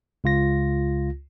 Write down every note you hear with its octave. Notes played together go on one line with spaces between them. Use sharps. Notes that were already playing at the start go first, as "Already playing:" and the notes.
C#2 F4 A#6